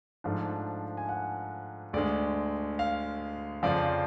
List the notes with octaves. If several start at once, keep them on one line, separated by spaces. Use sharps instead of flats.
G#2 F3 A3 D4 F5
G#5
F#5
D2 D3 G#3 D5
F5
F2 C#3 F3 D5